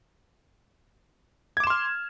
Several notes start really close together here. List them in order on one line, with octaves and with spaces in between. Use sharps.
G#6 D6 E7 C6 F6